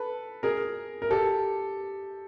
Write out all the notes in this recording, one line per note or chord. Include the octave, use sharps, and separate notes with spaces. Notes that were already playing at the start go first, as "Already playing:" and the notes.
Already playing: A4 B4
G#4 A#4
A#4
G4 A4